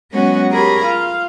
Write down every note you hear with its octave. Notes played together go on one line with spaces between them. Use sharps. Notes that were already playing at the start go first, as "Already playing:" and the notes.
F#3 G#3 B3 C#4 F#4
G4 G#4 A#4 C#5 A#5 B5
F4 F5